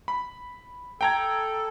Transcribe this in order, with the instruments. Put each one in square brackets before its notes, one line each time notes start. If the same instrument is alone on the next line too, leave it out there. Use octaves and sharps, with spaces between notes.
[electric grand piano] B5
[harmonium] A4 [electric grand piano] G5 A#5 G#6